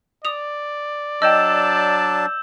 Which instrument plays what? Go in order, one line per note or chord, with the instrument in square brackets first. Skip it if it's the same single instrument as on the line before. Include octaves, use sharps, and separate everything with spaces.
[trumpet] D5 [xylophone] D#6 F7
[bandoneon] F#3 D4 A5 [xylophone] D#5 G5 [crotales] E6 G6 E7